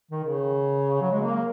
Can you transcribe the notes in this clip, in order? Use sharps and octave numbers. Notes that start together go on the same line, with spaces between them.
D#3
C#3
F#3
G#3
A#3